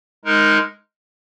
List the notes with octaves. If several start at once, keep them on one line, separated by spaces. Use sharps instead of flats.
G#3 D#4 A#4